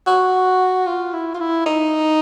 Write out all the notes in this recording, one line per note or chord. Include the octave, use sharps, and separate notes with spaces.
F#4
F4
E4
F4
E4
D#4